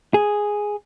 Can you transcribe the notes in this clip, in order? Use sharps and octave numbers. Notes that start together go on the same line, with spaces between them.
G#4